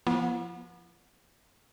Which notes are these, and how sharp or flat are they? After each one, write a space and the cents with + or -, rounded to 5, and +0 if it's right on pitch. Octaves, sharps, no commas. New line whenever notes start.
F3 +0 B3 -35 E4 +45